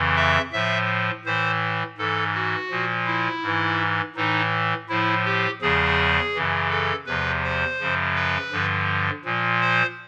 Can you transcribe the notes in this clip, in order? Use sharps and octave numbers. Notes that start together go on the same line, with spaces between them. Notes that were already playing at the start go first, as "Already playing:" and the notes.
Already playing: F2 C#3 E3
E5
A2 F3 E5
A2 E3 C5
G#2 E3 A4
F#4
A#2 F3
E4
G#2 E3
A2 E3 D#4
A2 F3 E4
G4
E2 C#3 F3 G#4
F#2 C#3 E3
A4
E2 C3 F3 B4
C5
F#2 C#3 F3
B4
G2 D3 F3
A#2 F3
C5